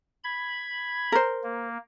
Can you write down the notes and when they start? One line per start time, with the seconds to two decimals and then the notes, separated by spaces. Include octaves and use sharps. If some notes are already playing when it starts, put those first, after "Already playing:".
0.24 B5 G#6
1.12 A#4 C5
1.44 A#3